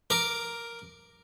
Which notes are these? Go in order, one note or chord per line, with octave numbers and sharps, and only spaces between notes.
A#4 D6